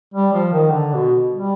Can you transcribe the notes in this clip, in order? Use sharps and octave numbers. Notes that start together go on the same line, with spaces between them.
G3
F3
D#3
D3
B2
G3